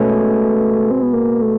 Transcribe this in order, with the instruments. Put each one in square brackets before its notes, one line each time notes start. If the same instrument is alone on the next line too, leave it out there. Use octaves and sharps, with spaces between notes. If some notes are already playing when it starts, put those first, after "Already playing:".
Already playing: [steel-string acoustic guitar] B2 G#3 C#4 [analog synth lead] A3
[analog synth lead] C4
B3
A#3
A3